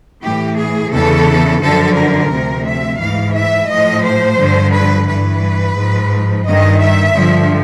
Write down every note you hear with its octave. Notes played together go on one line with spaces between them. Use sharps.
A2 E3 G4
G#4
E2 C#3 E3 A4
F#2 D3 F3 A4
A#4
D2 C3 F3
E5
G#2 E3 F5
E5
A2 F3 D#5
C5
G2 D3 F3
B4
G2 E3 B4
G#2 F3
G2 D#3 D#5
E5
G2 D3 F3